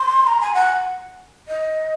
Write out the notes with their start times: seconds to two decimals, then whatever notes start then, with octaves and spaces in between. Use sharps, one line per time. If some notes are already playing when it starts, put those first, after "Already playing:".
Already playing: C6
0.27 A#5
0.41 G#5
0.54 F#5
1.48 D#5